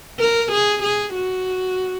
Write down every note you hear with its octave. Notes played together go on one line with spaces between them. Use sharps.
A#4
G#4
G#4
F#4